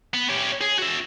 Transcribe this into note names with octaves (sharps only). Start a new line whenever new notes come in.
B3
C#4 G4
G#4
F#4 E5